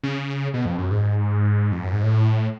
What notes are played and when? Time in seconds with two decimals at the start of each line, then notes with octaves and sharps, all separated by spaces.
0.03 C#3
0.54 B2
0.65 F2
0.78 F#2
0.91 G#2
1.72 F2
1.82 F#2
1.92 G#2
2.03 A2